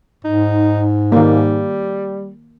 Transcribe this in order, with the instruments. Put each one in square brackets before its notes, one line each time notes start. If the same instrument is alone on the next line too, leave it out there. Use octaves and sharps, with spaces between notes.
[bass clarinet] G#2 [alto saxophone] D#4
[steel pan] D#3 A#3 [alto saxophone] G3